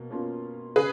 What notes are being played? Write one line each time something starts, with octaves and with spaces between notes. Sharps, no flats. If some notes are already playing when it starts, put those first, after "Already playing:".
Already playing: B2 A#3
B2 A#3 C#4 F4
C#3 G#4 B4